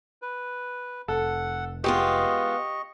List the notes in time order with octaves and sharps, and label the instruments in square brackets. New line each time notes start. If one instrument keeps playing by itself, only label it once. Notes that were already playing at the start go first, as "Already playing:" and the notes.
[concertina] B4
[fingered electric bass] F1 [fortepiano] A4 [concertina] F#5
[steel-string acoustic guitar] G#3 B3 F4 [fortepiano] G4 [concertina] D#5 C#6